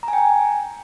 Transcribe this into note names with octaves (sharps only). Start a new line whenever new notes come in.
A#5
G#5
G5
G#5